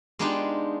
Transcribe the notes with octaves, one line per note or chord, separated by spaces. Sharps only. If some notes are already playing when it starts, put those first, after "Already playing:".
G#3 B3 D4 D#4 F4 G4